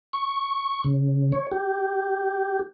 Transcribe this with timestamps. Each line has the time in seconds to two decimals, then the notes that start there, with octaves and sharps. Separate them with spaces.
0.13 C#6
0.84 C#3
1.32 C#5
1.52 G4